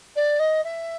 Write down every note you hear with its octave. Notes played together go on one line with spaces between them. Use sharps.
D5
D#5
E5